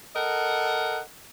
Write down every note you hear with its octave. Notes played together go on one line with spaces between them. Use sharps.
A4 A#4 D#5 F#5